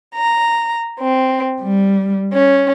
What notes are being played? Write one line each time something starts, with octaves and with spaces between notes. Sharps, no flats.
A#5
C4
G3
C#4